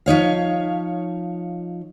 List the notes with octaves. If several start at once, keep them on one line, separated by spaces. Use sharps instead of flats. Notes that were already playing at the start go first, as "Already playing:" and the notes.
F3 D#4 C#5 F5